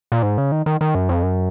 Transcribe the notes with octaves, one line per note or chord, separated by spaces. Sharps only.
A#2
G#2
C#3
D#3
D#3
D#3
F#2
F2
F#2